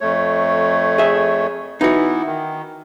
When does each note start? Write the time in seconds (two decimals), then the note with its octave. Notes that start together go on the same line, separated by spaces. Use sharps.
0.01 F2 A3 C#5
0.98 G#4 E5
1.81 E3 B3 D#4 E4 F#4
2.26 D#3